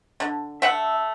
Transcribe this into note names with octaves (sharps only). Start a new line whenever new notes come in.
D3
A3 E5 F#5